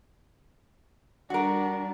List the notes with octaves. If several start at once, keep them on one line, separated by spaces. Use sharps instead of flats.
G3 D4 F#4 A#4